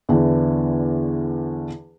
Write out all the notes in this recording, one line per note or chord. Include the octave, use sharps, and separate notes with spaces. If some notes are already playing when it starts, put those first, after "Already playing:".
E2 D3 E3